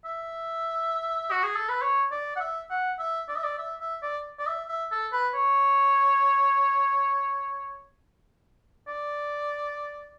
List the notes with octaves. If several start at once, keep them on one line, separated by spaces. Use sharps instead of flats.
E5
F#4
G#4
A4
B4
C#5
D5
F#5
E5
F#5
E5
D5
E5
D5
E5
E5
D5
D5
E5
E5
A4
B4
C#5
D5